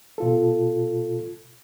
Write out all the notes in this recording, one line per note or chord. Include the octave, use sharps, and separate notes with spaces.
B2 F4 A4